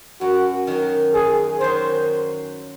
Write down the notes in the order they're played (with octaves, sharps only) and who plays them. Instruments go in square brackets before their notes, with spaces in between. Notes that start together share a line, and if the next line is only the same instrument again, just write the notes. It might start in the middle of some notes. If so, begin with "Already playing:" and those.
[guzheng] F#2 [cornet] F#4
[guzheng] D#3 F#3
[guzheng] F#2 [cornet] G#4
[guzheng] D#3 F#3 [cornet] C5